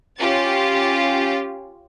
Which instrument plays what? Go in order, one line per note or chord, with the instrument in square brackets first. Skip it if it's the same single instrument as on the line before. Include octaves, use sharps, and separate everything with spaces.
[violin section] C#4 F4 G4 A6